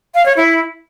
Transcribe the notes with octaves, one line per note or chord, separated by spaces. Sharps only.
F5
C#5
E4